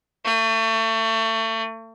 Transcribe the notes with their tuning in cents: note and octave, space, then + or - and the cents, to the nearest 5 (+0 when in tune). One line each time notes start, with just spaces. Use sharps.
A3 +30